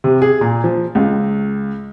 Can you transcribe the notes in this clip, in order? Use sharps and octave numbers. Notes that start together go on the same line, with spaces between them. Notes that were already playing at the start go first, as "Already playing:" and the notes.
C3
G#4
A#2
F3
C#2